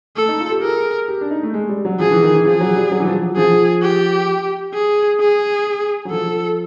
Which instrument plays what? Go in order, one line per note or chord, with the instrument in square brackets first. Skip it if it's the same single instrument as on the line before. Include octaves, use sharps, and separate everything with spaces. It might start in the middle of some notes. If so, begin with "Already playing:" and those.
[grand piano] A3 [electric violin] A4
[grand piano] D#4
F4
G4
[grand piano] G#4 [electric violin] A#4
[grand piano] G4
D4
D#4
A3
G#3
G3
F#3
[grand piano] F3 [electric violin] G#4
[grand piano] E3
D#3
E3
[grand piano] F3 [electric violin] G#4
[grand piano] F#3
G3
F#3
E3
F3
F#3
[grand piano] F3 [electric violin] G#4
[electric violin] G4
G#4
G#4
[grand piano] F#3
[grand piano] F3 [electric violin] A4